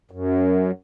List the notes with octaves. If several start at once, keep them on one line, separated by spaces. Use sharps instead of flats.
F#2